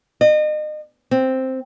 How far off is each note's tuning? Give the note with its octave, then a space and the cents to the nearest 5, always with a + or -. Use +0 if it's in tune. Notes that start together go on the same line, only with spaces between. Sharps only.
D#5 -35
C4 +0